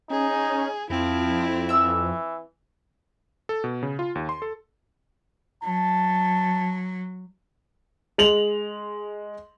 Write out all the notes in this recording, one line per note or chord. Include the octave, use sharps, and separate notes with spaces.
C#4 D#4 G#4
F2 F3 C4 E4
E3 E5 E6
A4
B2
C#3
F4
D#2
C6
A4
F#3 A5
G#3 F7 F#7